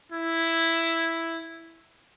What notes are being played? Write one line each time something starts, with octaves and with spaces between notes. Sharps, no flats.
E4